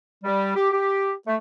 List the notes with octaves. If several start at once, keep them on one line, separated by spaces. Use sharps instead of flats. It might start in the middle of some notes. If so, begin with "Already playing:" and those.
G3
G4
G4
A3